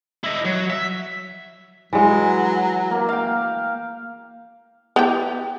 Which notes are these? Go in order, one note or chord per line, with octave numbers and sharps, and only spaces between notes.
E4 D#5
F#3
E5
E3 F#3 G#3
A#3
F5 G5
B3 E4 G4